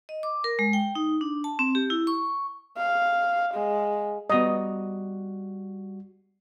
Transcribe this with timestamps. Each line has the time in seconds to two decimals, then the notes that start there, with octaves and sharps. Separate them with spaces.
0.09 D#5
0.23 D6
0.44 A#4
0.59 G#3
0.73 G5
0.95 D#4
1.21 D4
1.44 A5
1.59 C4
1.75 G4
1.90 E4
2.07 C#6
2.77 F5
3.54 G#3
4.30 G3 B3 F#4 D#5